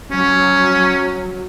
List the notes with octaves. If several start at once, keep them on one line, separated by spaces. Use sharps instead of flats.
F#3 C#4